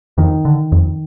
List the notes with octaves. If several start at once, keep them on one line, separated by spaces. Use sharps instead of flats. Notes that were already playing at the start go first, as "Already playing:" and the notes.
F2 D#3
D3
F2